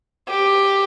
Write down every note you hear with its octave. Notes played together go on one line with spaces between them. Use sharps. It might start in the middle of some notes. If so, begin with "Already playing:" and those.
G4